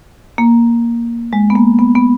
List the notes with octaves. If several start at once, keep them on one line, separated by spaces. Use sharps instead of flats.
A#3
G#3
B3
A#3
B3
B3